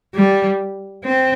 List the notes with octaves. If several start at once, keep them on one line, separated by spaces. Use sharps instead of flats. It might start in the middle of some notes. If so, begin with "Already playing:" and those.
G3
C4